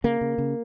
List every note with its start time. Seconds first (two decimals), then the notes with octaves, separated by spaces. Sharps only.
0.04 C#3 A#3
0.21 C#3
0.38 C#3